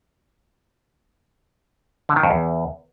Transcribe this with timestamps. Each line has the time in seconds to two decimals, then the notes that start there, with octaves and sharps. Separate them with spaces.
2.09 D3
2.16 D#3
2.23 F2
2.31 E2